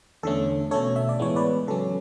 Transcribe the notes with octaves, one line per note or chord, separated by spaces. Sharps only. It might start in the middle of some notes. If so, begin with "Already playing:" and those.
E2 D3 A3 C#4 A4
B2 A3 C#4 A4 C#5
E5
D5
A2 E3 G#3 B3 C#5
B4 D5
C#3 F#3 C#4 A4